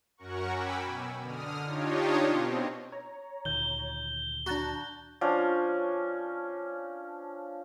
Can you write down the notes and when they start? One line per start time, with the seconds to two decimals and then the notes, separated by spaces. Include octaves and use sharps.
0.17 F#2 C#4 F#4 A#4 F#5 C#6
0.50 G5 G#5 B5 D6 E6
0.82 B2
1.21 D3 D#6 F6
1.63 D4 D#4 F4 G4 C#5 D#5
2.29 B2 C4
2.92 C#5 A#5
3.45 D2 A#2 D#3 G6 G7
4.46 D4 F#4 A5 A#5
5.21 F3 C#4 D4